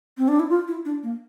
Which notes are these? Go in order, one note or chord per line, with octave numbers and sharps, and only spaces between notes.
C4
D4
E4
F4
E4
D4
A#3